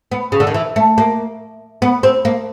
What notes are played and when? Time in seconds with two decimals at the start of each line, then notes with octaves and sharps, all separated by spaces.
0.11 B3
0.32 C#3
0.40 D3
0.47 D#3
0.54 E3
0.76 A3
0.98 A#3
1.82 B3
2.03 C4
2.25 A#3